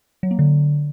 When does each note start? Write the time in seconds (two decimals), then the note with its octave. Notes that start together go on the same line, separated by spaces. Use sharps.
0.23 F#3
0.31 A#3
0.39 D3